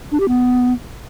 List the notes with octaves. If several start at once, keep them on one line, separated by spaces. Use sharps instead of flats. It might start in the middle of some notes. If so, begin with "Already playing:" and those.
D4
G4
B3